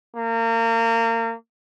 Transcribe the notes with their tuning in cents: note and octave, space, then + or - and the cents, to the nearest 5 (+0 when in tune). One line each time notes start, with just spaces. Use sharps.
A#3 -30